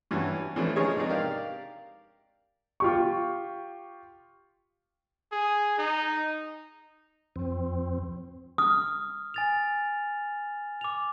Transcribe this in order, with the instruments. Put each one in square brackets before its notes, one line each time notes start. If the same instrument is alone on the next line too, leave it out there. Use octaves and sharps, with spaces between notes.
[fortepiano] G2 E3 G3 C#4 F#4
E3 F3 G3 A3 C#4 D4
C#3 F3 G#3 D#4 G#4 C#5
G#2 C3 D4 D#4
G4 A#4 D5 F5
[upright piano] F4 G4 C#6
[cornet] G#4
D#4
[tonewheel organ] F2 C4
[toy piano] D#6 [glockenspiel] F6
[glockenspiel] G#5 A6 F7
D6 F7